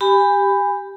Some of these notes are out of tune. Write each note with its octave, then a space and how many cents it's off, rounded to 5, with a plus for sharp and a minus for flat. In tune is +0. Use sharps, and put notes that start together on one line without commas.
G4 +0 G#5 -30 B5 +10